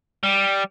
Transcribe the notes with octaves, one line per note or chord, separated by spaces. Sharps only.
G3